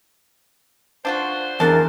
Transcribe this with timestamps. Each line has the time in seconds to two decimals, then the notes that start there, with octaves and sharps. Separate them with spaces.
1.05 D4 F4 F#4 C5
1.60 E2 D4 A#4 A5